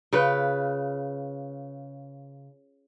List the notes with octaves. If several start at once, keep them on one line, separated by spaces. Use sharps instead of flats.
C#3 F4 B4